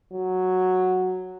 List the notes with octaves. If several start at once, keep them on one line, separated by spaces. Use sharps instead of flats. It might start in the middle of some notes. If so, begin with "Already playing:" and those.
F#3